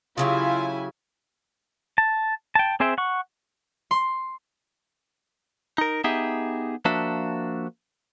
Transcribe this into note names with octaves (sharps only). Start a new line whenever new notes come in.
C#3 F3 F#3 E4 F4 G4 G#5
A5
G5 A5
C4 G#4 C5 E5 G5
F#5 C#6
C6
D#4 A#4
B3 D#4 G4 G#4 E5
F3 A#3 D4 F#4 E5